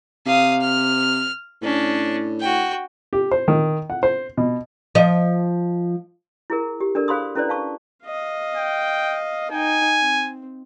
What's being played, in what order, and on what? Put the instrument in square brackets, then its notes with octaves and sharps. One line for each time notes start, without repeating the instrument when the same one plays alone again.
[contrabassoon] C3 [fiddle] F5 D#6
[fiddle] F6
[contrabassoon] A2 [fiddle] C#4 D4
[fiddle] F#4 G5
[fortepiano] G4
C5
D#3
F#5
C5
B2
[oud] F3 D#5
[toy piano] E4 G#4 A#4
G4
D4 A4 A#4 D5
G#4 C5 F5 B5 C6 D#6
C#4 E4 A4 B4 C5 D5
F5 A5 C#6
[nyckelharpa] D#5 F5
[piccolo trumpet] G5
[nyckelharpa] D#4 G5 [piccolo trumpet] G#5
[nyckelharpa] C4